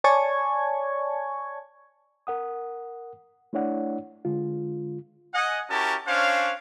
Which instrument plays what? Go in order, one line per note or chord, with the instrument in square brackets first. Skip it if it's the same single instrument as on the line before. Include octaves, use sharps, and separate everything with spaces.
[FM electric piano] C#5 D5 G#5 A5 C#6 G#6
[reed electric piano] A#4 F#5 D#6
A3 D4 E4 C#5 D5 F#5
D3 G#3 F4
[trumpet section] D#5 F#5 G#5
C#4 E4 F#4 G4 A#4 A5
C#4 D4 C5 C#5 F5